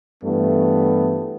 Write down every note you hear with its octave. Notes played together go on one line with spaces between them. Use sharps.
G2 E3 A3 B3